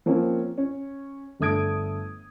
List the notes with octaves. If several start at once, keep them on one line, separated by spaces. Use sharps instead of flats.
F3 A#3 C4 C#4
C#4
G1 D3 A3 D#6 G#6 D7